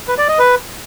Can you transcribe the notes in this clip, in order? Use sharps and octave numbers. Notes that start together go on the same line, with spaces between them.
B4
D5
D#5
B4